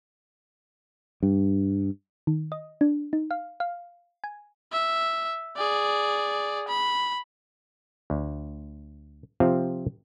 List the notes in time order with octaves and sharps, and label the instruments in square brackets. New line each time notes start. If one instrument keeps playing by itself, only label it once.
[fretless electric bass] G2
[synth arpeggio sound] D#3
D#5
D4
D#4
F5
F5
G#5
[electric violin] E5
G#4 D5
B5
[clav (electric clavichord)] D2
C3 F3 C4 F4 E5 F5